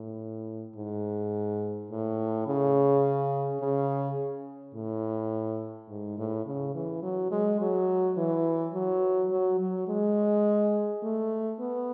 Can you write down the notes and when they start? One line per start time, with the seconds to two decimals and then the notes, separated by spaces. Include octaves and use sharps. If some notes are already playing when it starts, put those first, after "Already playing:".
Already playing: A2
0.76 G#2
1.91 A2
2.47 C#3
3.61 C#3
4.75 A2
5.89 G#2
6.18 A2
6.46 C#3
6.75 E3
7.03 F#3
7.31 G#3
7.60 F#3
8.17 E3
8.74 F#3
9.31 F#3
9.60 F#3
9.88 G#3
11.03 A3
11.60 B3